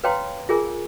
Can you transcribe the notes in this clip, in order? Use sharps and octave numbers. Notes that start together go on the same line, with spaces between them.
B4 C#5 F5 G5 A#5 C6
F4 G#4 A#4 G#5